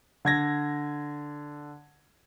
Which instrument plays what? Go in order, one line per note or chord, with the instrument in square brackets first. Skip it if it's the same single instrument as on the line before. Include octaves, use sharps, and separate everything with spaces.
[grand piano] D3 G#6 A#6